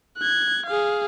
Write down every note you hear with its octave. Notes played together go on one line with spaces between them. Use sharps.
F#6 G#6
G#4 F5